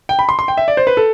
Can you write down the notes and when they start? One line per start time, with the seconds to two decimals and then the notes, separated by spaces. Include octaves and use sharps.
0.09 G5
0.19 B5
0.29 C6
0.39 C6
0.48 G5
0.57 E5
0.68 D5
0.77 C5
0.87 B4
0.97 A4